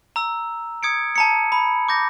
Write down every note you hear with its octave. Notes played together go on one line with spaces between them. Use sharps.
A#5 E6
D#6 G#6 C#7 D7
A5 A#5 C#7
B5
D6 G6 A#6